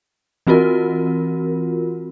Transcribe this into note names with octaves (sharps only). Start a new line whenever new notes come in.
E3 C4 F4 F#4 A#4